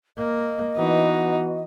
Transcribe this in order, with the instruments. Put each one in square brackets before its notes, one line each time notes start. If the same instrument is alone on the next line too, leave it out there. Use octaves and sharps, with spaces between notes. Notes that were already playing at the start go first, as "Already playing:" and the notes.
[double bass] A#3 [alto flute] D#5
[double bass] E3 [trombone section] B3 F#4 [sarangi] D#4